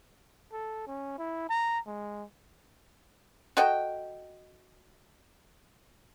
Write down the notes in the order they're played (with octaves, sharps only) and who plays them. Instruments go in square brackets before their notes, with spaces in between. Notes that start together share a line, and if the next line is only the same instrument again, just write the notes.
[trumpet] A4
C#4
E4
A#5
G#3
[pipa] F#4 A4 D#5 G5